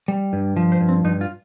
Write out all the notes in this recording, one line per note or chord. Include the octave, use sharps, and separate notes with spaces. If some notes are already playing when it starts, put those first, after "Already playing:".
G3
G2
F3
C5
G2
C4
G2 D#4
F4